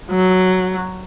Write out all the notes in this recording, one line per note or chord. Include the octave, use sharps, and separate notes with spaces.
F#3